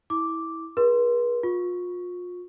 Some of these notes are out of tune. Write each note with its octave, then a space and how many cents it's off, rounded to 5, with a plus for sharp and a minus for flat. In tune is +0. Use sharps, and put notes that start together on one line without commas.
E4 -20 D6 -5
G#4 +0 B4 -45 C6 +0
F4 +35 C#6 +0